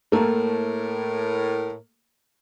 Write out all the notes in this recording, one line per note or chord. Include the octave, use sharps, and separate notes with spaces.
A2 A3 A#3 A#4